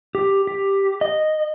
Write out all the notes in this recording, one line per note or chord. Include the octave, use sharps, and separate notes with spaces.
G4
G4
D#5